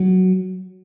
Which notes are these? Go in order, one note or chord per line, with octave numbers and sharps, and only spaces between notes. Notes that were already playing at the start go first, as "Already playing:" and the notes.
Already playing: F#3